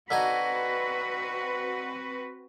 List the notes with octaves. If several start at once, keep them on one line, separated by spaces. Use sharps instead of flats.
D3 C4 D#4 F#4 B4 G#5